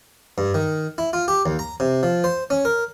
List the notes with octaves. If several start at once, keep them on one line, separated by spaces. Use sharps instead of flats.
G2
D#3
E4
F4
G4
D#2
A#5
C3
F3
C5
C#4
A#4